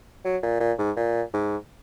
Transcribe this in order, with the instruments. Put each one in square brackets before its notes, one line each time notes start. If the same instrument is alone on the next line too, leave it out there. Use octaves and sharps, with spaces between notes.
[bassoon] F#3
A#2
A#2
G#2
A#2
G#2